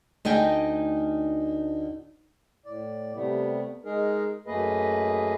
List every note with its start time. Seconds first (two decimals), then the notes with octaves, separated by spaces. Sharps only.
0.25 D2 D#4 D#5 G5 G#5
2.66 A2 D5
3.14 C3 G3 A3 B3
3.85 G#3 D#4 G#4 A#4
4.47 F#2 A3 A#3 G#4 B4 D#5